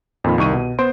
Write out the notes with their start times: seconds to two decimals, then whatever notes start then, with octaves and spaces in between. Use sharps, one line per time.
0.24 F2 A#2 D#3 F4 B5
0.38 C2 D#3 C#6 D#7
0.53 B2
0.79 B3 C5 C6 D7